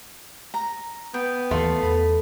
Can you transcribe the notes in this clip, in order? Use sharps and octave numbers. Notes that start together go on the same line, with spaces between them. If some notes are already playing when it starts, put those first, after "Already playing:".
A#5
B3 G5
D#2 E3 A3 F4 C6
E2 B5